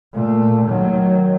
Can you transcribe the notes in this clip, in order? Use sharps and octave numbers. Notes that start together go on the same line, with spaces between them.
A#2 A3
D#3 F#3